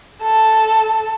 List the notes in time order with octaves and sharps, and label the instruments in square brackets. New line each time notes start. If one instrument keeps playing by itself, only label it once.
[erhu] A4